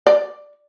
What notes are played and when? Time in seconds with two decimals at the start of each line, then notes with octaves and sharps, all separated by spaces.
0.07 D5